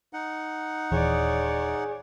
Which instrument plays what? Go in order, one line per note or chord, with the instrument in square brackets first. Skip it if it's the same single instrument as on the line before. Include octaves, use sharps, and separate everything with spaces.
[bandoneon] D#4 F#5
[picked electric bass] D#1 E3 [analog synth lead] G#4 [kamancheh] C#5 D5